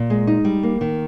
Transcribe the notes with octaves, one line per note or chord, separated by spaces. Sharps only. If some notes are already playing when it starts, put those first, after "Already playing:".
Already playing: A#2
G#3
D#4
G3
A#3
D#3